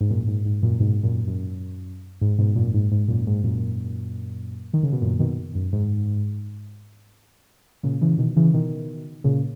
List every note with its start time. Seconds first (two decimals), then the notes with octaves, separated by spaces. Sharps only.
0.01 G#2
0.10 F#2 A#2
0.27 G#2
0.45 G#2
0.63 F#2 A#2
0.80 G#2 B2
1.03 F#2 A#2
1.27 F#2
2.21 G#2
2.38 G#2 B2
2.55 F#2 A#2
2.74 G#2
2.92 G#2
3.08 F#2 A#2
3.27 G#2
3.44 F#2 A#2
4.74 D#3
4.83 C#3
4.92 B2
5.02 F#2 A#2
5.19 B2 D#3
5.55 F#2
5.73 G#2
7.83 A#2 C#3
8.01 C#3 E3
8.18 B2 D#3
8.36 C#3 E3
8.54 B2 D#3
9.24 A#2 C#3